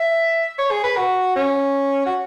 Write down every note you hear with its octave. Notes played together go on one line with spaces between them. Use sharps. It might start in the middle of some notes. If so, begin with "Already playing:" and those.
Already playing: E5
C#5
G#4
B4
F#4
C#4
F#4